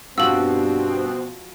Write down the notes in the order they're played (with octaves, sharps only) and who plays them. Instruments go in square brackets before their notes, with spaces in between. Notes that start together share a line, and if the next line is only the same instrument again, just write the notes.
[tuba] G2 [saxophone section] B2 B3 C4 [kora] F3 F#4 [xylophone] E6 F#7